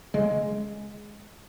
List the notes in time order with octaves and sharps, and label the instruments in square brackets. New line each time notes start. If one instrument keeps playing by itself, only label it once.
[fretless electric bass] C#3 G#3